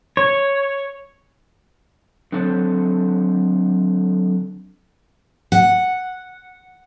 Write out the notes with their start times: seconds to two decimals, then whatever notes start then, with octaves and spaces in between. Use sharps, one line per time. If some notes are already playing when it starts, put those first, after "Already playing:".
0.17 C#5
2.32 D3 F#3 C4 A4 C5
5.52 F#5